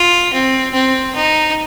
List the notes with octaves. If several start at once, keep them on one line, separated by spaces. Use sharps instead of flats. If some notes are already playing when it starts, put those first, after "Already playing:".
Already playing: F4
C4
C4
D#4